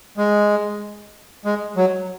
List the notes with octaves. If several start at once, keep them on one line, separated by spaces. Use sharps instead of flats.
G#3
G#3
F#3